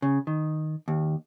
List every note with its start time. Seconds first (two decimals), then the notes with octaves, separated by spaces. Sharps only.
0.02 C#3
0.27 D#3
0.88 D#2